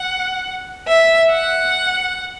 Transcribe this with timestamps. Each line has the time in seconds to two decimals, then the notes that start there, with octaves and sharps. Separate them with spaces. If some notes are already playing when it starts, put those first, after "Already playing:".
Already playing: F#5
0.88 E5
1.31 F#5